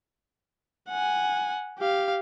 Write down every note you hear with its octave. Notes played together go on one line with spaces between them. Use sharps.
F#5 G#5
G4 F5